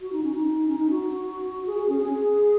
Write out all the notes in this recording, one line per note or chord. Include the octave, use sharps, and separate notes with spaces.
F#4
D#4
C#4
D#4
C#4
D#4
F#4
G#4
G#4
C#4
G#4